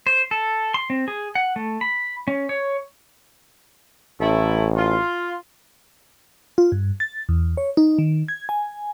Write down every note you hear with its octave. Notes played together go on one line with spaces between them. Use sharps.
C5
A4
C6
C4
G#4
F#5
A3
B5
C#4
C#5
A1 A3 C#4 E4
F4
F4
G2
A6
E2
C#5
D#4
D#3
G#6
G#5